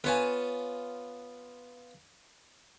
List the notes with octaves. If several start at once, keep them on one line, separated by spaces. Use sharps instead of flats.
B3 F4 B4 C#5 G#5 A5